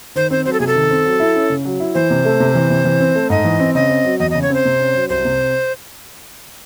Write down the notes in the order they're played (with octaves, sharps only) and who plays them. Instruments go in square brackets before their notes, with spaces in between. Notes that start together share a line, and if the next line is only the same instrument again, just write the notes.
[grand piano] D#3 [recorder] C5
[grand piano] C4 [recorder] C5
[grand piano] F#3 [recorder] C5
[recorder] A4
[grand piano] C3 [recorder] G#4
[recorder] A4
[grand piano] D#3
C4
F#3
E4
C#4
C#3
F#3
E4
[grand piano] E3 [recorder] C5
[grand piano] C3
A3
C3
E3
C3
E3
C4
A3
[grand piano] G#2 [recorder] D#5
[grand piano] E3
C4
[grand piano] C#3 [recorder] D#5
[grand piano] C4
F#3
[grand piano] E2 [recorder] D#5
[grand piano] C#3 [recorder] D#5
[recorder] C#5
[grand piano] C4 [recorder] C5
[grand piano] C3
C#4
F#3
[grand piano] C2 [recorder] C5
[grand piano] C3